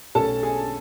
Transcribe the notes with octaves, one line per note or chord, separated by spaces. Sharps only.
B1 B2 A3 C#4 A4 A5
G#4 G#5